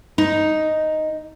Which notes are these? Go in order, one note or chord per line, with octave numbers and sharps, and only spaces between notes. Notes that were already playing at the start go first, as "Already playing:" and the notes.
D#4